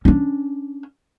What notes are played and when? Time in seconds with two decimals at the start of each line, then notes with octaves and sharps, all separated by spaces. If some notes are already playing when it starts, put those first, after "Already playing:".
0.05 C#4 D4